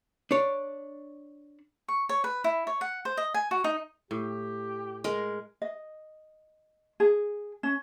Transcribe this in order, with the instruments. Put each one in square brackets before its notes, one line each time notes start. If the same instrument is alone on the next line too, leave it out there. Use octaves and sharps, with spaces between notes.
[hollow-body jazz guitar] D4 C#5
[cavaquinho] C#6
C#5
B4
E4
C#5
F#5
C5
D#5
G#5
F#4
D#4
[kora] A2 [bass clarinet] G4
[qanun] G#3 A#4
[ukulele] D#5
G#4
C#4